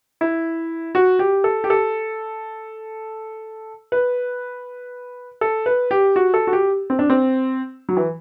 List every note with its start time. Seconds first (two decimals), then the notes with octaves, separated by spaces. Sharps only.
0.21 E4
0.95 F#4
1.19 G4
1.44 A4
1.64 G4
1.70 A4
3.92 B4
5.41 A4
5.66 B4
5.91 G4
6.16 F#4
6.34 A4
6.47 F#4
6.53 G4
6.90 C4
6.99 D4
7.10 C4
7.89 F#3
7.97 E3